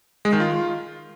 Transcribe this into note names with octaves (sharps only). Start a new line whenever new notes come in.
G#3
D#3
F4